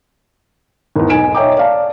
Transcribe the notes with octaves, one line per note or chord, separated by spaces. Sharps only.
G#1 E2
B1 G#5 D7 E7
C#5 D#5 E5 G5 A#5 D6
D5 F5 A5